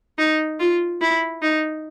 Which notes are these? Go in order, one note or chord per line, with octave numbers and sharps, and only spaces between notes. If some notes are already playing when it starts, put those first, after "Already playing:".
D#4
F4
E4
D#4